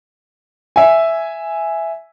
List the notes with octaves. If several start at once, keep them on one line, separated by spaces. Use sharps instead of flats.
E5 G#5